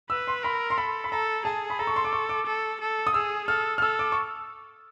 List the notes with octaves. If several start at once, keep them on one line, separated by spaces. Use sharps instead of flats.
B4 E6
C6
A#4 B5
C6
A4 B5
B5
A4 A#5
G#4 A5
B5
A4 A#5
C#6
C6
D6
C#6
D6
A4
A4
D#6
G#4 E6
A4 F6
F6
A4 E6
D6
C#6